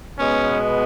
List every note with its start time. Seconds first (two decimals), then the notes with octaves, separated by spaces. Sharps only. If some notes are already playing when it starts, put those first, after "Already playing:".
0.18 B2 G#3 B3 C#4